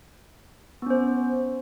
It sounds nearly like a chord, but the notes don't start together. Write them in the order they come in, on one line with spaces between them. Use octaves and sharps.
B3 C#4 C5